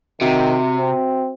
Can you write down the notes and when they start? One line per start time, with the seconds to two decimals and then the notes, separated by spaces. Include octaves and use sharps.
0.21 C3 D#3 F#4 E5
0.77 C4